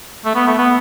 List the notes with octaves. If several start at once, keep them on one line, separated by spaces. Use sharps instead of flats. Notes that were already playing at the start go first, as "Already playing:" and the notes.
A3
B3
A3
B3